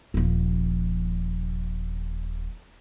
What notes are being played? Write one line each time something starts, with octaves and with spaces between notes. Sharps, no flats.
D#1 F3